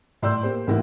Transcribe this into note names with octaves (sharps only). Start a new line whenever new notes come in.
A2 D5 C6 E6 G6
A#3 G4 C5
A1 A2 A#3 E4 F#4